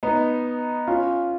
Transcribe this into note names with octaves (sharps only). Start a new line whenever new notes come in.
B3 D#4
C#4 F4